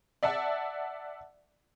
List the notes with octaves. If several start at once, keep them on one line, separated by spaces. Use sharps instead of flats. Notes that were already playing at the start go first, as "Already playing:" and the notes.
D5 E5 F#5 A5